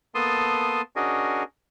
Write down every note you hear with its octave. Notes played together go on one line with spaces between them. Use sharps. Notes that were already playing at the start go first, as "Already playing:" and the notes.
A#3 B3 A4 A5 C6 D#6
C#4 D4 F#4 G#4 A#4 D#5